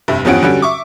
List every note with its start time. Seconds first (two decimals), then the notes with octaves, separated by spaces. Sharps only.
0.08 F1 G2 E5
0.25 E2 G2 F3 C#4 F#5 D7
0.43 D3 F#3 G3 C#4
0.62 E5 C#6 D6